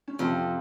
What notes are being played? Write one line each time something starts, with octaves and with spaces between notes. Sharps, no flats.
C#4
F2 C3 C4